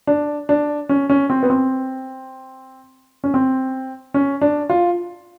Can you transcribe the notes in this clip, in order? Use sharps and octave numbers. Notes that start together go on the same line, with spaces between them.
D4
D4
C#4
C#4
C4
B3
C4
C#4
C4
C#4
D4
F4